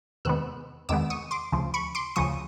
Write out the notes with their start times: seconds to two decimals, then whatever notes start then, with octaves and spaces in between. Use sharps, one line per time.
0.25 E2 C3 D#3 G#3 B3 E6 F#6
0.89 E2 C3 D#3 G#3 B3 D6 E6
1.10 C#6 D#6
1.31 C6 D6
1.52 D2 C#3 F3
1.74 B5 C#6
1.95 C6 D6
2.16 D2 C#3 F3 C#6 D#6